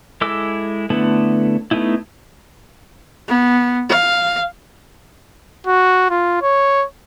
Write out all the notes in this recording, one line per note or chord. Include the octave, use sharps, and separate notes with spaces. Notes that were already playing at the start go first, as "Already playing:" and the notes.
G#3 E4 A4 D6 E6
D3 A3 B3 E4
A3 B3 D#4 E4
B3
F5
F#4
F4
C#5